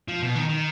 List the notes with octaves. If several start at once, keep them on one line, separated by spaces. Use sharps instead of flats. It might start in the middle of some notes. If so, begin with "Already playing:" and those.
F3
B2
D#3
D#3